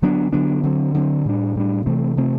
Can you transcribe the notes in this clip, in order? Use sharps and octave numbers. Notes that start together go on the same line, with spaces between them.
D3 F#3 B3 D4
D3 F#3 B3 D4
D3 F#3 C4
D3 F#3 C4
A2 G3 D4
A2 G3 D4
C3 E3 A3 C4
C3 E3 A3 C4